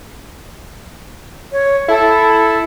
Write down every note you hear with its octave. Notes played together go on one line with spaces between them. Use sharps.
C#5
E4 A4